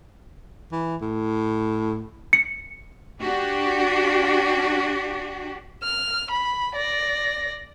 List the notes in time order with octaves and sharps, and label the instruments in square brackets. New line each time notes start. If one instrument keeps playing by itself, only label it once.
[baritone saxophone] E3
A2
[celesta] C#7
[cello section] D4 F#4 G4
[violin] F6
B5
D5 A#6